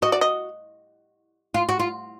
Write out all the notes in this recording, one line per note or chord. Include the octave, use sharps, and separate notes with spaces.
F#4 D#5
D5
D#5
F4
F#4
F4